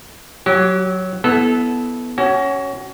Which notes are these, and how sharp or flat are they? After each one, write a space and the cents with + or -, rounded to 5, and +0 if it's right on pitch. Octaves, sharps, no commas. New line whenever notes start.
F#3 +0 G4 -30
B3 +0 E4 -5 A4 -20
C#4 +0 F#4 +30